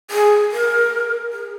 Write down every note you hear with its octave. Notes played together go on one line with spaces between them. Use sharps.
G#4
A#4
G#4